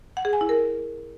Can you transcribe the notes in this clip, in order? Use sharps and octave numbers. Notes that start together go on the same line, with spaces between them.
F#5
G#4
G#5
E4
A#4